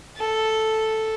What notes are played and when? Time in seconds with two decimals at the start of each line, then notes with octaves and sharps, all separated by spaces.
0.18 A4